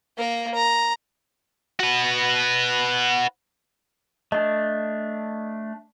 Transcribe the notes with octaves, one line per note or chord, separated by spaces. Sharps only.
A#3 A#4
A#5
F#4 B4
A3 D4 D#5